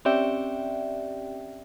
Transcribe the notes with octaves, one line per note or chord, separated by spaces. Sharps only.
C4 C#4 G4 D5 E5 G5